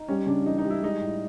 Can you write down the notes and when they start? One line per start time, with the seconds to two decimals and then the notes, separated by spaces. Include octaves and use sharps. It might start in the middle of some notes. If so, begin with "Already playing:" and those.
Already playing: D#4
0.08 G3 C#4
0.27 C#3 D4
0.46 E3 D#4
0.58 D#4
0.64 G3
0.70 E4
0.83 G#3 D#4
1.02 A2